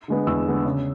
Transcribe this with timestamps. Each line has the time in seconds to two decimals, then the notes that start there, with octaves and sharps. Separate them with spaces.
0.08 D3 G#3 B3
0.27 E2 E6
0.46 D3 G#3 B3
0.66 C#3